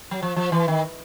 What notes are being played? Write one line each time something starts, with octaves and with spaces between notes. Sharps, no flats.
F#3
F3
F3
E3
D#3